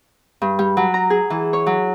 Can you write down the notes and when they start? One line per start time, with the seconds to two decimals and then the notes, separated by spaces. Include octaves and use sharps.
0.42 G2
0.59 G3
0.77 F#3
0.94 A#5
1.10 G#4
1.30 E3
1.53 C#5
1.66 F#3